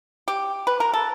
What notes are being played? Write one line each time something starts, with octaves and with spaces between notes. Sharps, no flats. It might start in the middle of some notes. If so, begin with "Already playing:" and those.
G4
B4
A#4
A4